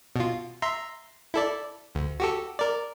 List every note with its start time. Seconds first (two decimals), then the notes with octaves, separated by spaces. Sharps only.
0.16 B2 F4
0.62 E5 A#5 C6
1.34 E4 A4 D5
1.95 D2
2.20 F#4 G4 A4
2.59 A#4 D5